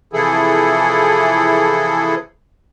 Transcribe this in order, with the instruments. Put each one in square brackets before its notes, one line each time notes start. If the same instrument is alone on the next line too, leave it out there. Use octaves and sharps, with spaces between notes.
[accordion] C3 E3 F3 E4 G#4 A4